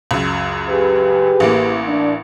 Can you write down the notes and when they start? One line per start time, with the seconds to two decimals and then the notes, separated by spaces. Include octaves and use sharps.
0.11 C#2 F#2
0.70 G4 G#4 B4
1.40 A1 A#3
1.88 D4